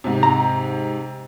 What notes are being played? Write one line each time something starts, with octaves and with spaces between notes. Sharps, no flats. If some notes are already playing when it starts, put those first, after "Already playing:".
G#2 C3
A#5